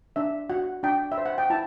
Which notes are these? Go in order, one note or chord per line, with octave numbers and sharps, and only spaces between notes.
D4 E5
F#4 F#5
D4 G5
E5
C5
F#5
G5
E4 A5